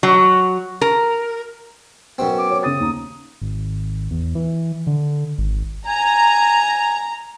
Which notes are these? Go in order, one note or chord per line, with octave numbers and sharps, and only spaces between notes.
F#3
A#4
F#2 B2 C4
D6
C#5
C#3 D#6 A6
D#2 A#5
G#1
E2
E3
D3
G#1
G#5 A#5